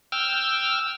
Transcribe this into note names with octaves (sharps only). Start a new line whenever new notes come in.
G5 E6 F6